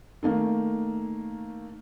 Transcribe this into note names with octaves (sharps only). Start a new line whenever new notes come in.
D#3 A3 A#3